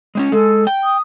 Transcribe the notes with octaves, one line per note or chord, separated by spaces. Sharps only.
G#3 C4 C#4
G#3 A4
G5
D#6